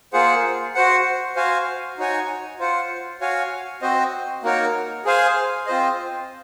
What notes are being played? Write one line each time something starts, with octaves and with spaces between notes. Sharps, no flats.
A#3 F4 G#4 C5 F#5
F#4 C5 F#5
F#4 C5 F5 G#5
D#4 F#4 C#5 G#5
F4 C5 F#5
F#4 C#5 F5 G#5
C4 F#4 C5 D#5
A#3 D#4 F#4 A#4 C#5
G#4 C5 F5 G#5
C4 F4 C5 D#5